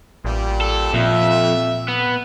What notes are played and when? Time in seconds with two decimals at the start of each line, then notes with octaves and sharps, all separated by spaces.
0.25 A1 A#2 G3
0.61 A4
0.94 F2 A#2 E5
1.88 B3